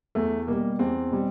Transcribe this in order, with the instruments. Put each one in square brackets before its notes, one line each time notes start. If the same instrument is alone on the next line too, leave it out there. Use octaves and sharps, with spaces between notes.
[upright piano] E2 A3
B2 G3 A#3
E2 C4
B2 G3